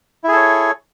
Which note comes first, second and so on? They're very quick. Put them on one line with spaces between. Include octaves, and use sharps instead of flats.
E4 G#4 A4 C#5